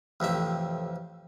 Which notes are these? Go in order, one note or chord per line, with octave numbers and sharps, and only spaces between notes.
A1 F2 C3 E5